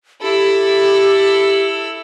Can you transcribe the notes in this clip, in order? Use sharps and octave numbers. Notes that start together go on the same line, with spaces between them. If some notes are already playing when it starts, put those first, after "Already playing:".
E4 G4 A4